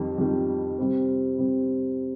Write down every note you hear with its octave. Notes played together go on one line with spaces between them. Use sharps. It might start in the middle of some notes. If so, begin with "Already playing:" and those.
Already playing: F2 D#3 G3
F2 D#3 G3
C3 G3 C4
C3 G3 C4